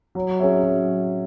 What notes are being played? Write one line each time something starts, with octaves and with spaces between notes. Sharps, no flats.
F#3
C#4 G#4 C#5 E5
F#3